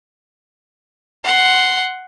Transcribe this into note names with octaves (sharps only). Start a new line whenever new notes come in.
F#5 C6